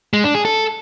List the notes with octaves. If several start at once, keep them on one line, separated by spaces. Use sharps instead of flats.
G#3
D4
G#4
A4